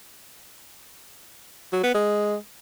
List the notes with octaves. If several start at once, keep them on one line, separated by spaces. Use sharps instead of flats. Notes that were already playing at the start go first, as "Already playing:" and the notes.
F#3
B3
G#3